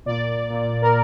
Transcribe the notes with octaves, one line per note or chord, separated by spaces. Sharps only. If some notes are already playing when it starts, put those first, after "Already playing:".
A#2 D5
A#2
A#4